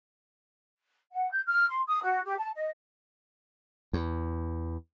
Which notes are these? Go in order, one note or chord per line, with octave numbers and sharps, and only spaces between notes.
F#5
G6
F6
C6
D#6
F#4
G4
A5
D#5
E2